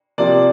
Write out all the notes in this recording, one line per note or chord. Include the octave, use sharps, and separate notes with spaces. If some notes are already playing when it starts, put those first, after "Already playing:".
C3 F3 A#3 D5